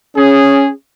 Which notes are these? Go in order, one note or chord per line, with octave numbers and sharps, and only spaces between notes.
C#4 G#4